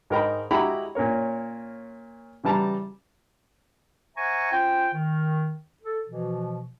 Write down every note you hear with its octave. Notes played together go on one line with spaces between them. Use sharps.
G#2 D#4 A#4 G5 A#5 B5
G#3 E4 F#4 G4 A#5 B5
A#2 C#4 A#4 C#5
C#3 E3 G3 A5 A#5
C5 E5 F#5 G#5 A#5 C#6
C#4 F4 C5 G5
D#3
A4
B2 E3 F3